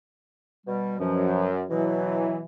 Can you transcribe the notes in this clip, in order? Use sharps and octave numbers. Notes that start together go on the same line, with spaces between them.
B2 G3
F#2 B2 F3
B2 E3 F#3